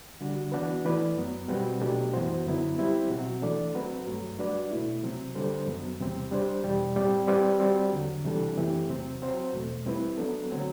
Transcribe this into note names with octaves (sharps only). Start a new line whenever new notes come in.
D3 G3 D4 F#4
E3 B3 D4 F#4 B4
E3 A3 E4 B4 D5
F#2 F#3 B3
B2 G3 C4 F#4 B4
B2 F#3 A3 D4 G4
F#2 E3 B3 F#4 C5
F#2 D3 F#3 B3 E4
G3 C4 E4 G4 C5
B2 F#3 C4 F#4
E3 A3 D4 A4 D5
F#3 C4 F#4 B4
G2 F#3 A3
G3 D4 F#4 B4 D5
B2 A3 E4
C3 F#3 C4
D3 G3 D4 A4 C5
F#2 F#3 B3
E2 C3 G3 C4
G3 D4 G4 C5
E2 B2 G3
A2 G3 C4 G4 D5
G3 C4 G4 B4
G3 C4 F#4
E2 D3 F#3
C3 E3 G3 D4 A4
F#2 E3 A3 C4 G4
E2 C3 F#3 C4
F#3 C4 F#4 C5
E2 B2 A3
G3 C4 E4 B4
F#3 B3 D4 A4
D3 F#3 A3 C4